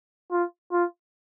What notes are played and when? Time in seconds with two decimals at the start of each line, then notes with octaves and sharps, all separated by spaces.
0.31 F4
0.72 F4